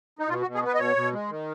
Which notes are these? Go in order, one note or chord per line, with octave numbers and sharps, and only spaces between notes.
D#4
B2 F4
F#4
B2
G#4
B3 B4
D#5
B2 C#5
B2
G#3
D#3